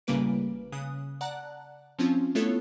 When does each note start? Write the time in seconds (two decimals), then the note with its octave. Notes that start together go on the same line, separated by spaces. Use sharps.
0.07 A1 C#3 G3 A#3 B4 D7
0.72 C#3 D#6 F#6
1.21 D5 F#5 A5 A#5 F#6
1.99 F3 C4 C#4 F4
2.35 A3 B3 E4 F4 A4 C#5